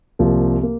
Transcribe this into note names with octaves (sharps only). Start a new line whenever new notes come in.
C2 C3 F3 A#3
A#3